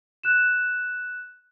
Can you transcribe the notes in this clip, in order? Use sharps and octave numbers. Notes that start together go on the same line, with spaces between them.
F#6 E7